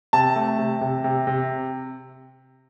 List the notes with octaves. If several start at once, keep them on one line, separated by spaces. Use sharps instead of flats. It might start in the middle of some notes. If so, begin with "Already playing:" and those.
C3 A5
A3
C3
C3
C3
C3